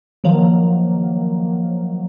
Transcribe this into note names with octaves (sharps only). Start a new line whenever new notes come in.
D#3 F3 F#3 A#3